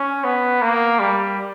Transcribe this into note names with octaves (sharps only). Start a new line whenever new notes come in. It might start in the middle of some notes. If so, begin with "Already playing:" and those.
Already playing: C#4
B3
A#3
G3